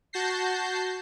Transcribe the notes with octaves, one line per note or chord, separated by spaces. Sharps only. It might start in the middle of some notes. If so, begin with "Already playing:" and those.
F#4 A5 G6 A#6 C7